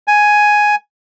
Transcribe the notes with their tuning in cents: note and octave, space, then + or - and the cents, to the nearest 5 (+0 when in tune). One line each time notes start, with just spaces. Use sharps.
G#5 +5